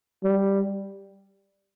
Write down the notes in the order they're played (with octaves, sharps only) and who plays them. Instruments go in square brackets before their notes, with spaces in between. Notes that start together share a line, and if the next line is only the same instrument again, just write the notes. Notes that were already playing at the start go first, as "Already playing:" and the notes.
[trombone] G3